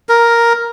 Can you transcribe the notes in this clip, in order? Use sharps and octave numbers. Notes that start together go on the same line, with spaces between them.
A#4